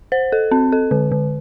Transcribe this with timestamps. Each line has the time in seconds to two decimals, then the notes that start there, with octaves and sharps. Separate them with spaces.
0.12 C5
0.32 A4
0.51 C4
0.72 A4
0.91 D3
1.12 D3